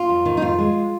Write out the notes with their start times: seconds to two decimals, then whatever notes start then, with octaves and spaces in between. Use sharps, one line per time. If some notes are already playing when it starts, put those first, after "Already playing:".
Already playing: F4
0.09 F2
0.25 D#3
0.37 D#4
0.41 F2 F4
0.58 G#3